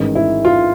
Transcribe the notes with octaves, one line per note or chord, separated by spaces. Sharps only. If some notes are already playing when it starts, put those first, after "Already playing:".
Already playing: A1 G#2 D#3
E4
F4